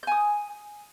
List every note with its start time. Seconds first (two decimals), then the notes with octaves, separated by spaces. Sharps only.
0.03 G6
0.07 G#5
0.12 D#6